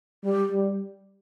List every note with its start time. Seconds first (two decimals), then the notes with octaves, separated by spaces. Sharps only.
0.24 G3 G4
0.52 G3